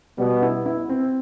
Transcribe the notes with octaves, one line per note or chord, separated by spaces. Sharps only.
B2 G3 B3
E4
E4
C4